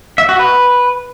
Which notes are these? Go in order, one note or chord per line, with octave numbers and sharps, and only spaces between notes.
E5
F#4
B4